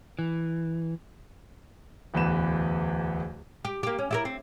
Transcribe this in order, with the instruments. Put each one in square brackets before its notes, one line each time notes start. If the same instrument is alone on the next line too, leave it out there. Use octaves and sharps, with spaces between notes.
[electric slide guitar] E3
[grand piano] D1 E2 E3 B4 E7
[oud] G4
A#3 G4
C#4
E4 G4 A#4
C4